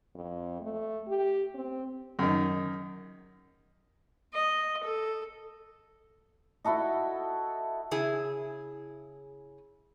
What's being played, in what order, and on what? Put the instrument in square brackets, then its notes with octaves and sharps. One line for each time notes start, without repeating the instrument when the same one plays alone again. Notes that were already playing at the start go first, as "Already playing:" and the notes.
[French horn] F2
A3
G4
C4
[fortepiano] F#2 D#3
[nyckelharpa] D#5
A4
[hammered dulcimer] E4 F#4 A4 D#5
[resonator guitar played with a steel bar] C#3 E4 G#4